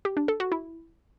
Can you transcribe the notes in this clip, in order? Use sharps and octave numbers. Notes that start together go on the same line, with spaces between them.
G4
D4
A4
F#4
E4